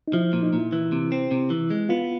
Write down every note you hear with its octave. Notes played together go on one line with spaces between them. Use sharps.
D#4
F3 E4
A#2
D#4
A#2
E4
E3
C3
C4
C3
E3
G#3
B3 F4